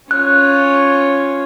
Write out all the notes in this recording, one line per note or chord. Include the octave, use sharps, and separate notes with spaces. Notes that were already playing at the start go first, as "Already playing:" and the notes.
C#4 F4 C#5 F#6